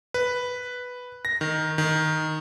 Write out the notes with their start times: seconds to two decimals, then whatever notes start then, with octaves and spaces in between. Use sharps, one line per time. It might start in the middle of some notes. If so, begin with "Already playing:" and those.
0.14 B4
1.25 A#6
1.41 D#3
1.78 D#3